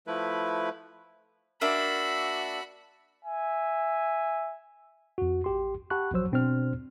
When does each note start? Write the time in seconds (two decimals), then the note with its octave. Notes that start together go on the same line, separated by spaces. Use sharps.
0.07 F3 A3 E4 B4
1.61 A#3 D4 F#4 E5 B5
3.25 E5 G#5
5.18 F2 F#4
5.44 A1 G4 C6
5.90 G4 F#5 A5 B5 C#6 F#6
6.12 A#1 F3 F#3 C5 E6
6.32 B2 C4 D4 C5 F6